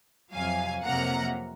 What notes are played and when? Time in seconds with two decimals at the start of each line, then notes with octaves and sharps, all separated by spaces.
0.33 F2 C3 F#3 F5 G#5
0.84 F2 C3 F#3 A#3 F#5 A#5